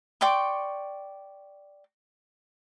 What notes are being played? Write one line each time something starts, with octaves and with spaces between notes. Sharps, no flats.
D5 G5 C6 C#6